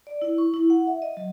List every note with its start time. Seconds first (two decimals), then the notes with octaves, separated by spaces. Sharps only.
0.07 D5
0.22 E4
0.38 C#6
0.54 E4
0.70 F#5
0.87 E5
1.02 D#5
1.17 F#3